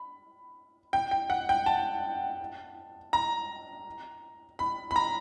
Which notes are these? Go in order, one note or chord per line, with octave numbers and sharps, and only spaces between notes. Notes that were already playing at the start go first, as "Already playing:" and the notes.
Already playing: B5
G5
G5
F#5
G5
A5
A#5
B5
B5
A#5